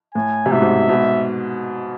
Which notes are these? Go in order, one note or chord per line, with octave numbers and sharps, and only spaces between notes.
A2 G#5
C3
G#2 B2 E5
G#2 B2
G#2 B2